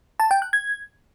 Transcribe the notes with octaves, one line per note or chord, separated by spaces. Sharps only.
A5
G5
F#6
G#6